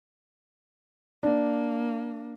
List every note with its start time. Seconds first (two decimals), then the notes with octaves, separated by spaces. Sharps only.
1.23 A#3 D4